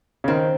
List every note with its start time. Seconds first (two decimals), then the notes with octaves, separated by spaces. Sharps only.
0.24 C#3
0.28 D#3 C4